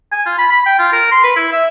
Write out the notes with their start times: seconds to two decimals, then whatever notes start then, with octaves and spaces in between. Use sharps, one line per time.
0.12 G#5
0.26 F4
0.38 B5
0.52 B5
0.66 G5
0.79 F4
0.93 A#4
1.12 C6
1.23 B4
1.36 E4
1.53 E5